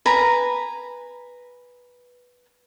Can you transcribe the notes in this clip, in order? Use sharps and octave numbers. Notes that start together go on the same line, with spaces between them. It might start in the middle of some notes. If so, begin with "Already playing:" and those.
B4 G#5 A#5